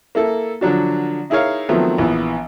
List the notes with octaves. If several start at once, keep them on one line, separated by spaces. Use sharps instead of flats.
A#3 E4 A4
D3 F3 F#3 D4 F#4
D#4 E4 G#4 A#4 C#5 F5
D#3 F3 F#3 A3 B3 C4
A#1 E3 B3